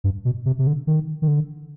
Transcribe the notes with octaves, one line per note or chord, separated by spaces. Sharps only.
G2
B2
C3
C3
D3
D#3
D#3
D3